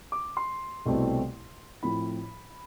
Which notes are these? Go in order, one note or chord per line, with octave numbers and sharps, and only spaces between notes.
D6
C6
C2 B2 A3 C4 E4
A2 F3 C4 E4 B5